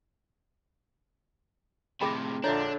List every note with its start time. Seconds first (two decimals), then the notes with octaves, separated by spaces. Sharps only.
2.01 A2 C3 G#4 D#5 G5 B5 D6 A#6
2.44 A#1 D3 D4 F4 C#5 D#5 E5 A#5